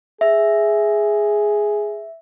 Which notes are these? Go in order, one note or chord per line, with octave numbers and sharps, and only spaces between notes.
G#4 E5